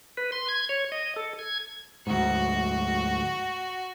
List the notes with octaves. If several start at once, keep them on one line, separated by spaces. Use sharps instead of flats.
B4
C6
G#6
C#5
D#5
A4
G#6
D2 G#2 F#4